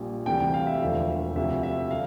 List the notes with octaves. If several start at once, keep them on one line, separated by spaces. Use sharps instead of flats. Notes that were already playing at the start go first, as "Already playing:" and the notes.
Already playing: A#1 A#2 G3
D2 C3 E3 G3 G5
G5
F5
E5
E1 D2 D3 F3
D2 C3 F3 E5
E5
D3 F5